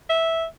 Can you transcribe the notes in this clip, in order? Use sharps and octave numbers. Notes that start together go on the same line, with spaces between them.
E5